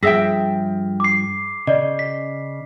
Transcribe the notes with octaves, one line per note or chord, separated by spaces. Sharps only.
G2 F3 G#4 E5 G5 E6 A#6 B6
D6 C7
C#3 D5 D#5
B6